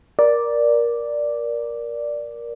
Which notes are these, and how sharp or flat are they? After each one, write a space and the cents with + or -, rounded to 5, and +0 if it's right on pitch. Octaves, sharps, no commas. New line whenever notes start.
A#4 +20 D5 +0